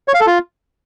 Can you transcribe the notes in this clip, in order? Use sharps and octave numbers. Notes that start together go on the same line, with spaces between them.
C#5
F5
A4
F4